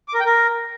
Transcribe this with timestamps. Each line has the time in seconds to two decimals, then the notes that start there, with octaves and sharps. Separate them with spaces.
0.08 D6
0.14 A#4
0.20 G5
0.26 A#4